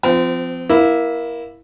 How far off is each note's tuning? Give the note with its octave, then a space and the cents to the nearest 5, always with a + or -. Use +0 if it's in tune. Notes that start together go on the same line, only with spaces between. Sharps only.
F3 +0 C4 -30
A#3 +15 E4 +0